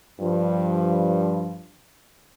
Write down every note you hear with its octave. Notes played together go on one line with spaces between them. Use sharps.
G2 F3